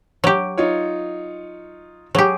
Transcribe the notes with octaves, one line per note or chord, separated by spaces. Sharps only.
F#3 G4
D#4 F4 C#5
F#3 G4 G#4